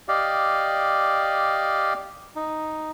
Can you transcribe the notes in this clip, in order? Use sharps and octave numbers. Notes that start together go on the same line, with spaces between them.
G4 D5 D#5 F5
D#4